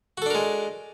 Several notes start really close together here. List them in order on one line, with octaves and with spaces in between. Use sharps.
F#4 A4 D4 A#4 G#3